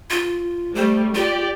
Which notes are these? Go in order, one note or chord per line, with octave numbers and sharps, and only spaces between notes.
F4
G3 A3 C5
F4 G4 D5